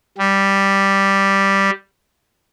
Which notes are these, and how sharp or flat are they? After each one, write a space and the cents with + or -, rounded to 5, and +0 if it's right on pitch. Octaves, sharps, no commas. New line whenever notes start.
G3 +0